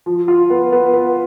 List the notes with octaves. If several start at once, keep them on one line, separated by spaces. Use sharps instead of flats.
F3
F4
B3
B3
B3